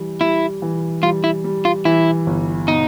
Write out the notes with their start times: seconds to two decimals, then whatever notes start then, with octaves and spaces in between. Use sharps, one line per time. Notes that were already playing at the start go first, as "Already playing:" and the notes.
Already playing: E3 G3
0.21 G3 E4
0.62 E3
1.03 G3 F4
1.24 E4
1.44 G3
1.65 F4
1.85 E3 E4
2.26 G1
2.67 B2 D#4